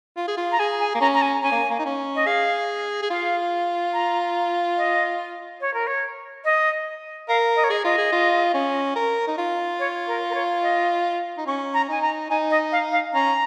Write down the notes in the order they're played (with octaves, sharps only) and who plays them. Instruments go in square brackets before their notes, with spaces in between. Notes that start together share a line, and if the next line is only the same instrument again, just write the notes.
[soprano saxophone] F4
G#4
F4
[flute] A#5
[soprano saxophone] G#4 [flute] G#5
[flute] G#5
[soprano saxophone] A#3
[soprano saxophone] C#4 [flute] A#5
[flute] A#5
G#5
[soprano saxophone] C#4 [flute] G#5
[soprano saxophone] A#3
A#3
D#4
C#4
[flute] D#5
[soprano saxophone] G#4 [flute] F5
[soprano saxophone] G#4
[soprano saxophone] F4 [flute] F5
[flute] A#5
D#5
C#5
A#4
C#5
D#5
[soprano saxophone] A#4 [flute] F5
[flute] D#5
C#5
[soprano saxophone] G#4 [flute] D#5
[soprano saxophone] F4 [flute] D#5
[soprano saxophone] G#4
F4
C#4
A#4
D#4
F4
[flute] C#5
A#4
A#4
C#5
D#5
[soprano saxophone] D#4
[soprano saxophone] C#4 [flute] C#6
[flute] A#5
[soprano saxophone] D#4 [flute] G#5
[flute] A#5
[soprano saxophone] D#4 [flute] G#5
[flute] D#5
F5
F5
[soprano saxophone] C#4 [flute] A#5